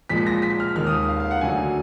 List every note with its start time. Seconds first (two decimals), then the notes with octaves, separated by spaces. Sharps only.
0.09 A#2 F3 G#3 B6
0.27 A#6
0.42 B6
0.60 F6
0.76 D#2 D#3 G#3 F6
0.87 D#6
1.08 F5
1.20 F5
1.31 F#5
1.41 D2 D3 F#3 G#5